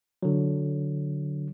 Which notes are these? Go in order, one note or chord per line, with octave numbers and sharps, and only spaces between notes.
D3 F#3